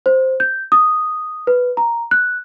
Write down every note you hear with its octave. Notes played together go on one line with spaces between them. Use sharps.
C5
G6
D#6
B4
A#5
F#6